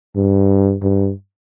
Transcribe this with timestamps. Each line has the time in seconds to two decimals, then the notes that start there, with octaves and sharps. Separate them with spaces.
0.16 G2
0.83 G2